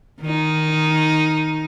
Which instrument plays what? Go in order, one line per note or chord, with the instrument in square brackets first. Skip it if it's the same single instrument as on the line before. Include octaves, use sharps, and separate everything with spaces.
[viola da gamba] D#3 D#4